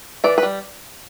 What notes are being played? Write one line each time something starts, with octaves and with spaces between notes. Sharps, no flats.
E3 D5
B4
G3